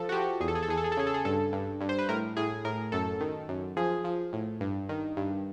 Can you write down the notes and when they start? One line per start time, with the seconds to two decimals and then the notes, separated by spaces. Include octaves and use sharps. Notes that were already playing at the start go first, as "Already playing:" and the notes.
Already playing: F3 A4
0.09 F#4
0.12 F3 G4
0.41 E2 G#4
0.48 A4
0.55 G#4
0.63 A4
0.68 E2 G#4
0.77 A4
0.84 G#4
0.92 A4
0.97 C#3 G#4
1.07 A4
1.14 G#4
1.25 G2 A4
1.52 G2
1.81 G2
1.89 C5
1.99 B4
2.09 A2 A#4
2.37 A2 G#4
2.65 A2 A#4
2.92 F#2 A4
3.20 D#3
3.49 F#2
3.77 F3 G#4
4.04 F3
4.33 A2
4.60 G2
4.89 D#3
5.17 G2